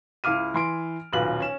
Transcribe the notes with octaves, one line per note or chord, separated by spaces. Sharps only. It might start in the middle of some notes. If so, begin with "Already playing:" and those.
C#2 E4 F5 D6 F6 D#7
E3 C6 D7
D#1 B1 F4 F#4 B4 F#7
C#4 E7